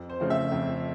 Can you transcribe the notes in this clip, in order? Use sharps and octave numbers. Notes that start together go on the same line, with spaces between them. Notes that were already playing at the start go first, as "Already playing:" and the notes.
Already playing: F2
C5
C#3 F3 A3 C4
E5
F2